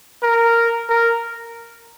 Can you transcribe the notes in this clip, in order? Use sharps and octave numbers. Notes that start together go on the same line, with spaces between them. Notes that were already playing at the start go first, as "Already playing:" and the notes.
A#4
A#4